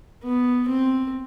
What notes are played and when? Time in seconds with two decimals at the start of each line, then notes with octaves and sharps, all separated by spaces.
0.23 B3
0.69 C4